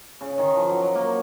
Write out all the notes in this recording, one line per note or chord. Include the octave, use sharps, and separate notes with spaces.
C#3
D#3
F3
F#3
F#3
A#3